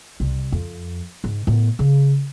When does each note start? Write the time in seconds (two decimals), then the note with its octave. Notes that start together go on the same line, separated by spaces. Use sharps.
0.20 C2
0.52 F2
1.24 G#2
1.47 A2 B3
1.79 C#3